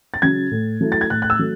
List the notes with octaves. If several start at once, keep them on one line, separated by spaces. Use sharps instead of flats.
A6
C#3 F#3 G#6
A2
F#3 A3 E4
A6
G#6
A2 F#6
F#6
E6
F#3 A3